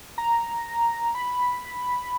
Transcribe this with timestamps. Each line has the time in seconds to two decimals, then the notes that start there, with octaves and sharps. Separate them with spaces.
0.18 A#5
1.15 B5